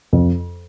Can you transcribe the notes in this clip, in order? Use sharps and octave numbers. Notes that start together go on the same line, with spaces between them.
F2